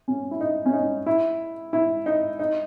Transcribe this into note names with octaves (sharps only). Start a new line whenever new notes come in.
C#4
E4
D#4
C#4
D#4
E4
E4
D#4
D#4